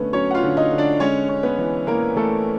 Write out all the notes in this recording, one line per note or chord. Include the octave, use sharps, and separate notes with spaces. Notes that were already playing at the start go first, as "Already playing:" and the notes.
Already playing: D3 A3 B3 C#4 D4 B4
F#3 C#4 C#5
F#5
F4 F5
D3
D#4 D#5
D3
D4 D5
G#3 C#4 C#5
C#4
B3 B4
E3
E3 A#3 A#4
E3 A3 A4